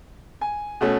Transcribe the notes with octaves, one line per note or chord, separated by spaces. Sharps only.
G#5
B2 A3 C#4